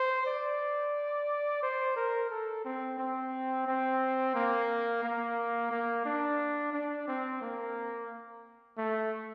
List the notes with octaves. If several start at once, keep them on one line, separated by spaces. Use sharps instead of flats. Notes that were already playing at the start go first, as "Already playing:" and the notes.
Already playing: C5
D5
C5
A#4
A4
C4
C4
C4
A#3
A#3
A#3
D4
D4
C4
A#3
A3